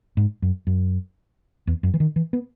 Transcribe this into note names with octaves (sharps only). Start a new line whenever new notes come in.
G#2
F#2
F#2
E2
F#2
E3
D#3
E3
B3